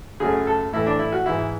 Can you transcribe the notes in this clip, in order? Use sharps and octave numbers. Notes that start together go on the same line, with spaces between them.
F#2 C#3 F#3 A3 G#4
A4
A2 E3 A3 E4
D4
E4
F#4
G#2 E3 G#3 E4